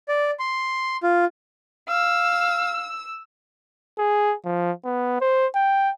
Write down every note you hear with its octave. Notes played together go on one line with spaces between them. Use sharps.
D5
C6
F4
F5 E6
G#4
F3
B3
C5
G5